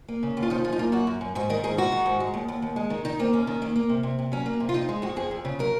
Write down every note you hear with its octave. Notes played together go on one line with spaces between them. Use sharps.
A#3
C#3
D#2
F4
F3 D#4
F#2 F4
D#4
A#3 F4
F#2 F#4
F#2
F#2
G#2 F#4
D#3 A#4
G#2 G#4
G#3 F#4
D#3
G#2
G#3
D#2
D#2
D#2
G#3
D#3
D#3 D#4
A#3 C4
D#2 C#4
D#3
A#3
A#3
C3
C3
C3
F#3 C#4
A#3
C3
F4
F2 D#4
G#3
F2 F#4
F2 G#4
F2
C#3
F#3 A#4